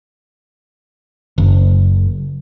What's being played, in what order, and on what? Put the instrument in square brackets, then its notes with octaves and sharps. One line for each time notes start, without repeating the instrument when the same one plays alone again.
[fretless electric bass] F#1